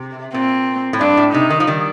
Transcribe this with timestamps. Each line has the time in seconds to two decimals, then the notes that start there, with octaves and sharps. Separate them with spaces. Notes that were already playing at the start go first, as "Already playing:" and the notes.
Already playing: C3
0.33 A#2 C4
0.93 A2
1.00 G2 D4
1.17 A2
1.33 C3 D#4
1.50 D#3
1.60 F3
1.67 D#3 G3